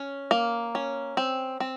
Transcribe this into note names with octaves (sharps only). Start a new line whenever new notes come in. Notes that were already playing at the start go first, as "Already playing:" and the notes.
Already playing: C#4
A#3
C#4
C4
C4